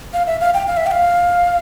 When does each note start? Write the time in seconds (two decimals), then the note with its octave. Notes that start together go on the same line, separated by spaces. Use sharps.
0.13 F5
0.27 E5
0.41 F5
0.54 G5
0.67 F5
0.77 E5
0.86 G5
0.91 F5